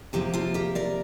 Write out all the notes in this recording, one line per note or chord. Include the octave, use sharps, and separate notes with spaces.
C3 F3 A#3 G4
F4 A4
G4 A#4
A#4 D5